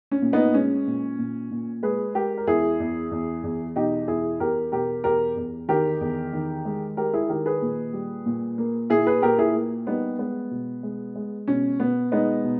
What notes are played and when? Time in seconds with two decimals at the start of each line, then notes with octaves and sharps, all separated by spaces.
0.11 C#4
0.22 A#2
0.33 B3 D#4
0.54 G#3 C#4
0.87 A#2
1.18 A#2
1.51 A#2
1.83 G#3 G#4 B4
2.15 G#3 G4 A#4
2.37 A#4
2.47 E2 E4 G#4
2.80 E2
3.11 E2
3.44 E2
3.76 B2 D#4 G4
4.08 E2 E4 G#4
4.40 E2 G4 A#4
4.72 B2 G4 A#4
5.04 E2 G4 A#4
5.37 E2
5.68 D#3 G4 A#4
6.01 E2
6.33 D#3
6.65 G#3
6.97 G#3 G4 A#4
7.13 E4 G#4
7.29 D#3 G4 A#4
7.46 G#4 B4
7.62 A#2
7.93 G3
8.26 A#2
8.58 A#3
8.90 A#2 E4 G#4
9.06 G#4 B4
9.22 A#2 G4 A#4
9.38 E4 G#4
9.55 A#3
9.87 G3 B3 D#4
10.19 G#3 B3
10.51 B2
10.83 G#3
11.16 G#3
11.48 B2 C#4
11.80 B2 B3
12.12 G#3 B3 D#4
12.44 B2